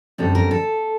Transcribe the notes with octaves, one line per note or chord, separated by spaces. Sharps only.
F#2 D3 G3 C4 A4
A#4
A4